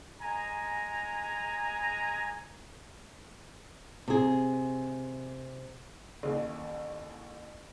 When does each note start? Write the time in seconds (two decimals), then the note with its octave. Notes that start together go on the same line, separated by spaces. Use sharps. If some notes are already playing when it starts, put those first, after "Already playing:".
0.21 G#3 G#5 A#5
4.08 C3 G#4
6.23 A1 D#2